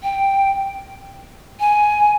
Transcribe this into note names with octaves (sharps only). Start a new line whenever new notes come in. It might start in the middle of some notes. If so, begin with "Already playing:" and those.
G5
G#5